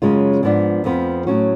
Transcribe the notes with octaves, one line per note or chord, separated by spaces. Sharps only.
F#2 C#3 G#3 C#4 F4
G#2 F3 B3 D4
F2 F3 B3
A2 F#3 C#4 F#4